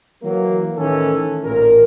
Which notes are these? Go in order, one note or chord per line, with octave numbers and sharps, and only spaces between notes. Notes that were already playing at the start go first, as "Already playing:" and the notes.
E3 F#3 A#3 A#4
A1 D#3 E3 C#4 A4
A1 A#2 A#4